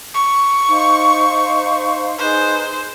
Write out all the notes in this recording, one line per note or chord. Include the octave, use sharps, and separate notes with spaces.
C#6
D#4 C5 F5
D#4 G#4 B4 C5